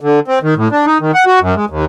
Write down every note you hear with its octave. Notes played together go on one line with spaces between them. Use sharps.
D3
C4
D#3
A2
D4
D#4
D#3
F#5
F#4
F#2
G#3
D#2